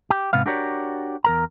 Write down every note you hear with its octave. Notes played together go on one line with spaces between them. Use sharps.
G4
G#2 C3 B3 F5
D4 F#4 G4 A#4 C#5 D5
E2 A#4 A#5